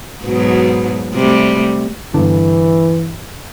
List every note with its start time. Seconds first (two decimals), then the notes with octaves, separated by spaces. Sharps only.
0.23 G#2 B2 F#3
1.14 C3 G3 A3
2.14 G2 D3 E3